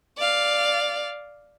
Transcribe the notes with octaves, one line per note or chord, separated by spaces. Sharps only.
D5 F5